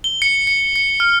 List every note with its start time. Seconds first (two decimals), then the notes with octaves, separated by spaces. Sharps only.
0.04 G7
0.22 C#7
0.47 C#7
0.76 C#7
1.00 F6